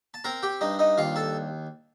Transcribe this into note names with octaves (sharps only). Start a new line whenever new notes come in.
A5
C4 A#4 A#5
G4 G5
G2 D#4 D#5
D#4 D#5
D#2 F4 F5
A4 A5